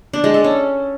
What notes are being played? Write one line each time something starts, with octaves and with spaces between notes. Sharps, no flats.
D4
G#3
A4
C#4